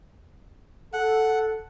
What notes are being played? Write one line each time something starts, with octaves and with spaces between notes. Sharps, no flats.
A4 F#5